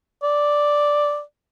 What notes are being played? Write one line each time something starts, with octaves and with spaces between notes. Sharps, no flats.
D5